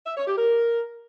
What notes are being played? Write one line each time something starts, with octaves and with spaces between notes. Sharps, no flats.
E5
C#5
G4
A#4